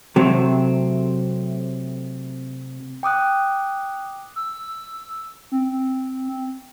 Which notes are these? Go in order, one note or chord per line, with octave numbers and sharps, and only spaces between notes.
C3 F#3 A3 C4
G5 D6 D#6 F#6
E6
C4